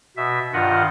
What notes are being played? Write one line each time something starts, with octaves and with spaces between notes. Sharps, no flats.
B2 E5
G2 D#3 F4 D#5 F#5